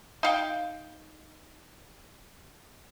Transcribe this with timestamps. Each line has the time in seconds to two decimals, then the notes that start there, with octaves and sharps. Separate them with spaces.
0.23 D#4 F5 G5